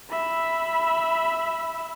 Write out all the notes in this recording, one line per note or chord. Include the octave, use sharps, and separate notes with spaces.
E5 B5